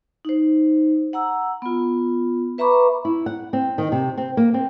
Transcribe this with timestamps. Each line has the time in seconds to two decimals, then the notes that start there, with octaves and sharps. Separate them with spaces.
0.25 D#4 C5
1.13 F#5 A#5 E6
1.62 B3 F4
2.58 B4 E5 A#5 B5 C#6 D6
3.05 E4
3.26 F#5
3.53 C4
3.78 D#3
3.92 C3
4.17 C4
4.37 A#3
4.54 C4